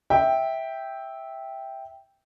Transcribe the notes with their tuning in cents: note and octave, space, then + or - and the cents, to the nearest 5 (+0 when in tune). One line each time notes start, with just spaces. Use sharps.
E5 -10 G5 +0